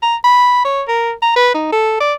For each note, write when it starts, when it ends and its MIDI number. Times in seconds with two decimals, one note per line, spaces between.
0.03 0.16 82
0.24 0.61 83
0.65 0.82 73
0.88 1.13 70
1.22 1.32 82
1.36 1.50 71
1.54 1.70 63
1.72 1.99 69
2.00 2.14 74